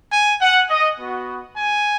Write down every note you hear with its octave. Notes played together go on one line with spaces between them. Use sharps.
G#5
F#5
D#5
B3 F#4
G#5